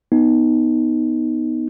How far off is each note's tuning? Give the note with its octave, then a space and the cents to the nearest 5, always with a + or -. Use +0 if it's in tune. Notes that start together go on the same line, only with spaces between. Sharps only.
B3 +0 D#4 +0